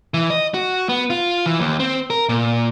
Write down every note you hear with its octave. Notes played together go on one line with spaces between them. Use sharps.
E3
D#5
F#4
B3
F4
E3
D#2
C4
A#4
A#2